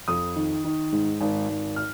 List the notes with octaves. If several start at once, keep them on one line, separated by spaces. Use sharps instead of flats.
F2 D#6
D#3
D#3
G#2
G#1
G#1
F6